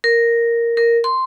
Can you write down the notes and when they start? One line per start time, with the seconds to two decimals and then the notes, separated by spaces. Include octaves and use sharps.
0.04 A#4
0.77 A#4
1.04 C6